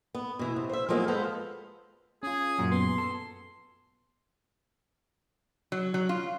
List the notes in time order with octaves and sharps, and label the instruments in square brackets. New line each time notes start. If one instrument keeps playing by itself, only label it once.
[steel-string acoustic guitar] B3
B2 E3
C3
C5 E5
F3 F#3 G#3 A#3 B3 G#4
G#3 A4 B4 C5 F5 F#5
[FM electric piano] C#4 F4 [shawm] G#4
[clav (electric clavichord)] F#2 A#2
[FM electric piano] B3 [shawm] C6
[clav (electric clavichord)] A4
[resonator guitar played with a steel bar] F#3
F#3
F4